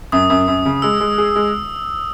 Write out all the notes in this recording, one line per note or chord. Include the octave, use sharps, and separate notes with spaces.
F#2 D#6
F#2
F#2
C#3
G#3 E6
G#3
G#4
G#3